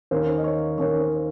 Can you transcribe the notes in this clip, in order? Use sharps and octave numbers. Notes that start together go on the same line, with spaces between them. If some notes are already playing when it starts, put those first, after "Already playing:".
D#2 D#3 A#3 C#4 C5
D#5
C#5
D#2 D#3 A#3 C#4 C#5
C5